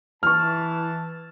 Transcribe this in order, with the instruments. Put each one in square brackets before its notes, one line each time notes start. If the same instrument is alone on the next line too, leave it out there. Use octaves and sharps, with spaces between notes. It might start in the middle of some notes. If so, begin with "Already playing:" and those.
[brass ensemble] E3 A5 [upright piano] C#6 F6